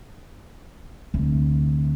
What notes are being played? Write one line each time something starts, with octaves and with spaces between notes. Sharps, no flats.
D2 C3